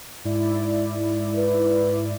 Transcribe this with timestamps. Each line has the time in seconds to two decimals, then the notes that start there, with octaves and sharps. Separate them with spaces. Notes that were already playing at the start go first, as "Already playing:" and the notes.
0.25 G#2 E4 D5
1.36 B4